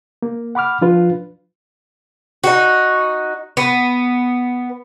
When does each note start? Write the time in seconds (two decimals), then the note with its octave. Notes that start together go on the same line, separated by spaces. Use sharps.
0.22 A#3
0.55 F#5 B5 D6 F6
0.82 F3 D4 F4 B4
2.44 D#4 F#4
3.57 B3